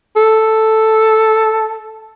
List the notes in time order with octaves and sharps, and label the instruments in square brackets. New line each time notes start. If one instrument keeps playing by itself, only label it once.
[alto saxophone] A4